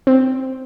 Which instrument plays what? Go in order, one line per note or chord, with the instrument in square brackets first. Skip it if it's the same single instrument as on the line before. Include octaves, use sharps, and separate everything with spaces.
[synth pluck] C4